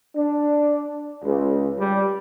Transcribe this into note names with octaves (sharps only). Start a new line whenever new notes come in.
D4
C#2
G3